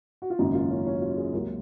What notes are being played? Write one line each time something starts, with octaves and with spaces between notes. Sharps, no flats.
F#4
F4
G#1 F#2 C#3 F#3 A#3 D#4
F4
C#4
C#4
F4
G#4
C#2 C3 F#3 A#3 A#4